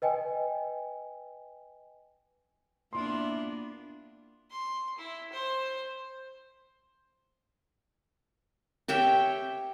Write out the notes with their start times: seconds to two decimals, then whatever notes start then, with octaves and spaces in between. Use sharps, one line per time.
0.02 B4 D#5 G5 G#5
2.93 A#3 B3 D4 E4 F4 C6
4.51 C6
4.98 E4
5.32 C5
8.88 G4 C#5 E5 G5